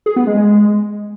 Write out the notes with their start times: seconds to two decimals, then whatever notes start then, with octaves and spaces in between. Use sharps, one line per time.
0.06 G#4
0.16 B3
0.27 G#3
0.37 G#3